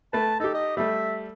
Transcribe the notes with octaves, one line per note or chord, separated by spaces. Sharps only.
A3 B4 A5
D#4 G4 A4
D#5
G3 A3 E5